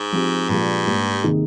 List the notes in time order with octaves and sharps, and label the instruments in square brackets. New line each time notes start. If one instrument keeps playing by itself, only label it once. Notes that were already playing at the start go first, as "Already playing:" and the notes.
Already playing: [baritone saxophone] G#2
[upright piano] F3 C4 G4
[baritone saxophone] G2 [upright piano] A#2 F3 G#3
[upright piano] G#2 G3 A#3
C3 D#3 A#3 D#4 G#4